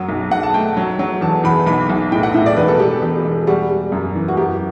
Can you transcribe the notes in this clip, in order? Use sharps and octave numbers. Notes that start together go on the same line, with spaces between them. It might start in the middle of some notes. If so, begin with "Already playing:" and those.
Already playing: F#2 F#3
B1
B1 F#5
A5
A3 G5
F#3
F#3
E2 A5
E2 B5
B1 B5
B1
A2 G5
F#5
A2 E5
D5
E1 B4
A4
E1 G4
E1 G4
E1
G3 F#4
G3
F#2
E3
F#4
F#2 G4